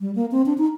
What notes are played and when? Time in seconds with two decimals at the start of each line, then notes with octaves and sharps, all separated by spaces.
0.01 G3
0.15 A#3
0.31 C4
0.46 D4
0.58 D#4